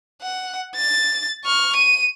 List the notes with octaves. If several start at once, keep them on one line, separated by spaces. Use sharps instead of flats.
F#5
A6
C#6 F6
D#7